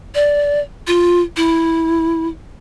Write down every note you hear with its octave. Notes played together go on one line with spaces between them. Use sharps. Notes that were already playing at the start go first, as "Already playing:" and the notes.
D5
F4
E4